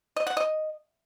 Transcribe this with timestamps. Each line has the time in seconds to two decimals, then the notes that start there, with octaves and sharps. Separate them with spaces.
0.16 D#5
0.27 F#5
0.37 D#5